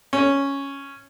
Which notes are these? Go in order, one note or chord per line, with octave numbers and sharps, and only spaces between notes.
C#4